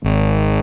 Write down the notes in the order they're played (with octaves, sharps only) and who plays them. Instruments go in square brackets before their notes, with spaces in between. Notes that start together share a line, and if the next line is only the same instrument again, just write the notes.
[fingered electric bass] G#1